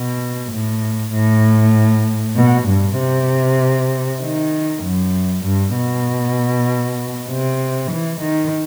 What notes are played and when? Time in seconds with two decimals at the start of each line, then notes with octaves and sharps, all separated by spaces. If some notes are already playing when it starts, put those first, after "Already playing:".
Already playing: B2
0.53 A2
1.13 A2
2.37 B2
2.68 G2
2.99 C3
4.22 D#3
4.83 F#2
5.45 G2
5.76 B2
7.30 C3
7.91 E3
8.21 D#3